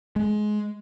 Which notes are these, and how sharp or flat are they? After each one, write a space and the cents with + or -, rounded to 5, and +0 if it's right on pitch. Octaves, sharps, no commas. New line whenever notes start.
G#3 +20